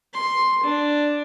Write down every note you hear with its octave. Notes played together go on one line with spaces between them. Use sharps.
C6
D4